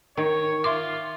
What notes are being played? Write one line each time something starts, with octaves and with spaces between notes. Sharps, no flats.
D#3 C#5
F4 E5 C6 D6